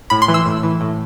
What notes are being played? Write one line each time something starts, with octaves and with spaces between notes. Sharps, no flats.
A2 B5
C6
E3
E6
A2
E3
A2